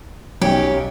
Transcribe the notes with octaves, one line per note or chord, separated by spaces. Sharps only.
B1 C#4 G4 G5